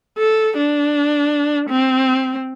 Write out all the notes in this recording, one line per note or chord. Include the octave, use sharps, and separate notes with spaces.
A4
D4
C4